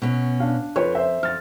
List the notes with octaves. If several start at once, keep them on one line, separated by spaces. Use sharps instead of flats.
B2 C#4
D4 F5
F2 F4 B4 C#5
C5 E5
F2 F6 A6